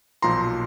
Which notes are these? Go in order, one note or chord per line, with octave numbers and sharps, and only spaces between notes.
B1 A#2 F3 A#5 C6